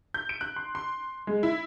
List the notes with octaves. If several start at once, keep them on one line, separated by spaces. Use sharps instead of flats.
G6
D7
F#6
C6
C6
G#3
E4